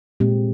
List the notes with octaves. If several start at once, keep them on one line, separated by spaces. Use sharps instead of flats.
A#2 G#3 C4 G4